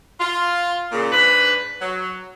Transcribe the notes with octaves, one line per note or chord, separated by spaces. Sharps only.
F4
A#2 C#3
G#2 D4 B4
F#3